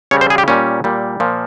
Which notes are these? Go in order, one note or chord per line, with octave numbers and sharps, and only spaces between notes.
C#3 G3 C#5
C5
G#4
G4
A#2 G3 C#4
A#2 G3
A#2 F3